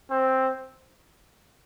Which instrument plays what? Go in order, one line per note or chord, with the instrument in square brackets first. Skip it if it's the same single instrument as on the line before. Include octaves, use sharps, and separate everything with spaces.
[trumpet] C4